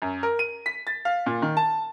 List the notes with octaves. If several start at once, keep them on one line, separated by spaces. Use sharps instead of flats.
F#2
A#4
D#7
B6
A6
F5
A#2
D#3
A5